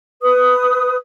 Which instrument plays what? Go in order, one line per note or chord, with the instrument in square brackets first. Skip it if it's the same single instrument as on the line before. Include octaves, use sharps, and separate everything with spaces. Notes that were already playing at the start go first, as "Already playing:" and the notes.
[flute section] B4 D#6